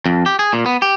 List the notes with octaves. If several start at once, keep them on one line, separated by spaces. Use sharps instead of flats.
F2
G4
G#4
A#2
B3
G4